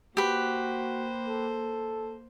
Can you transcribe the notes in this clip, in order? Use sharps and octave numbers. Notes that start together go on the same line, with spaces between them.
A#3 F#4 G4 B4 C5
A4